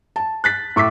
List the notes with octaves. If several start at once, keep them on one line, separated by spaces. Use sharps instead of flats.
A5
F#6 A6 B6
A2 C#6 D6 E6 B6